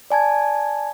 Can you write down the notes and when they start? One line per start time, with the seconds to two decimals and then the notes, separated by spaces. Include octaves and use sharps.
0.10 D5 G#5 A5 G#6